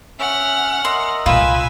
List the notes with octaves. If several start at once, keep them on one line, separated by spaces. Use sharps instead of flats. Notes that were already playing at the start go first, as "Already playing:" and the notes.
C#4 E5 F#5 F6
A#4 D#5 E5 C6
C2 A#2 F4 B4 G#5 B5 E6